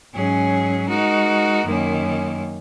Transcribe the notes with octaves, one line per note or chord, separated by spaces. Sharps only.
G#2 F#3 C#4 G#4
G#3 D#4 F#4 A#4
F#2 D#3 A#3 C#4